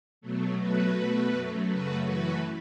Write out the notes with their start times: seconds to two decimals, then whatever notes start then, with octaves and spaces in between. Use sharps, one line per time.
0.21 B2 F#3 A3
0.59 B2 F#3 A3 F#4 B4
0.95 B2 A3
1.33 F#2 F#3 A3
1.70 F#2 C#3 A3 F#4 B4
2.06 F#2 E3 A3 F#4 B4